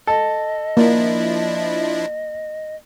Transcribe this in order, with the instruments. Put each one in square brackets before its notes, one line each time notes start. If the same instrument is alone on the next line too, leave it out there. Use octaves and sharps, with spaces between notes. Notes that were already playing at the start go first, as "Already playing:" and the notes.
[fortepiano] A4 [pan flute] D#5
[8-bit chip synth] F3 D4 E4 [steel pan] A#3